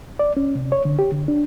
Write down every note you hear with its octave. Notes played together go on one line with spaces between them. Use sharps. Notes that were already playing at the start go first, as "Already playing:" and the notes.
D5
C#4
C3
C#5
D3
G4
D3
D4